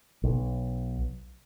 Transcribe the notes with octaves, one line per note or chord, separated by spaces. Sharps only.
B1